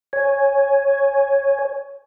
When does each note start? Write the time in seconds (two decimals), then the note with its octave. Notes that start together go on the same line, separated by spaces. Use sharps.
0.13 C#5 G#5